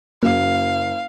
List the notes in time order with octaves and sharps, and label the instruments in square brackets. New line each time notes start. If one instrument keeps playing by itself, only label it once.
[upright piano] F#1 [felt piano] F#2 [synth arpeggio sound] A#3 [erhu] F5